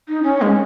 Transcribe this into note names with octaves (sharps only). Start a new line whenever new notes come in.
D#4
C#4
G#3